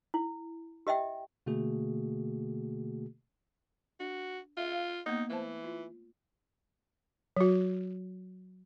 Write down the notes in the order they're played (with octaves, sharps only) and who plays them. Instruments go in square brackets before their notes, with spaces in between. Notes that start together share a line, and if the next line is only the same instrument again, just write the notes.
[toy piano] E4
G4 D#5 E5 G5
[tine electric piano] B2 D3 A3 A#3 F#4 G#4
[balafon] D4 [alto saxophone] F#4
[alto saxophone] F4 [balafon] E5 F5
[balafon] F5
[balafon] A#3 B3 [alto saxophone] D#4
[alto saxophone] E3 [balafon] A3 C5 A5
[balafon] F4
F#3 F#4